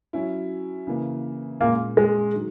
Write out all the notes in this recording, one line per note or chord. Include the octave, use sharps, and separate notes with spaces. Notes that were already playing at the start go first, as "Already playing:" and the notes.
F#3 C#4 E4
C#3 E3 A#3
A#2 G#3 A#3 C#4
G#3
D#3 F#3